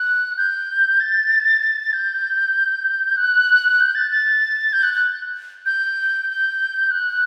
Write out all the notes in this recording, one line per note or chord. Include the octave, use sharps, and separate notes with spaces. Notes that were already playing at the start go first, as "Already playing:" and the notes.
Already playing: F#6
G6
A6
G6
F#6
G6
A6
A6
G6
F#6
F#6
G6
G6
F#6